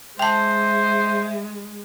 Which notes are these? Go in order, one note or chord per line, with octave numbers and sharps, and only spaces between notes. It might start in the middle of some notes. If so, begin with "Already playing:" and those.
G#3 C5 E5 G5 A5